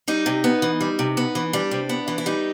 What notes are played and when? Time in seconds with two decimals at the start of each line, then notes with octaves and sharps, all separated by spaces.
0.08 G3 D#4
0.26 C3
0.44 B3
0.62 E3
0.81 G3
0.99 C3
1.17 B3
1.35 E3
1.53 G3 D4
1.71 C3
1.89 B3
2.08 E3
2.18 E4
2.26 G3 D#4